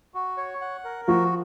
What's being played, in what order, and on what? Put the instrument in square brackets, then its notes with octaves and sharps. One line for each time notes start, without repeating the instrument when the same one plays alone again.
[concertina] F#4
C#5
F#5
A#4
[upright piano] F3 F4 [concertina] F#4